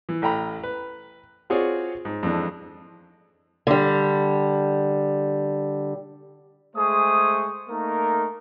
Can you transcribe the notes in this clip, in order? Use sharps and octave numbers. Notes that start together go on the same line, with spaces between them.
E3
A1 A4 G5 A#5 B5
B4
C4 F4 F#4 G#4 C#5 D5
G#2
F2 E3 G#3 D4
D3 G3
G#3 A3 G#4 C5 C#6 D#6
A3 A#3 D#4 A#4